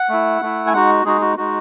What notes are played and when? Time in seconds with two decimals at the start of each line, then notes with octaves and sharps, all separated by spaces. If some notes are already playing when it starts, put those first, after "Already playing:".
Already playing: F#5
0.09 A3 E4
0.42 A3 E4
0.67 G#5
0.74 G#3 D#4 F#4 F#5
1.05 G#3 D#4 F#4 G#4
1.21 F#4
1.37 G#3 D#4 F#4